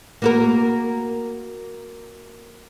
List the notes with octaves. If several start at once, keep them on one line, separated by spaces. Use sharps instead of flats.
A#3 F#4 A#4